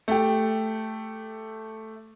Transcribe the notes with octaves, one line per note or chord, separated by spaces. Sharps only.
A3 G4